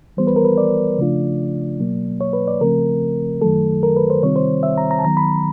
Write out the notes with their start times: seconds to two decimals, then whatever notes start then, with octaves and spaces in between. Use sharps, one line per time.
0.17 E3 G3 B3 C5
0.27 B4
0.36 A#4
0.44 B4
0.58 D5
0.98 C#3 F3 A3 D4 F4
1.79 B2 F#3 A#3
2.21 C#5
2.33 B4
2.48 D5
2.60 C#3 F3 A3 C4 A#4
3.42 F#2 D#3 F#3 A3 A4
3.83 A#4
3.96 B4
4.10 C5
4.23 C3 D#3 G3 C4 F4 C#5
4.36 C5
4.63 E5
4.78 A#5
4.91 A#5
4.99 A5
5.05 D#3 F#3 B3 A#5
5.17 B5